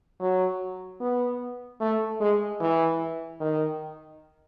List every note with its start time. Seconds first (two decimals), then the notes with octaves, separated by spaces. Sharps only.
0.20 F#3
1.01 B3
1.81 A3
2.20 G#3
2.61 E3
3.40 D#3